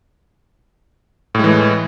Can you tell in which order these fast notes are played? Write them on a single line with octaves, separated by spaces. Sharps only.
A2 G#3 E3 A3